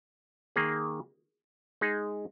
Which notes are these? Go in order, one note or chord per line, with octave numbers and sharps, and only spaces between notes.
D#3 A#3 G#4
G#3 D#4 G#4